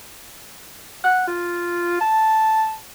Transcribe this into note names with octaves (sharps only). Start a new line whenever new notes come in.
F#5
F4
A5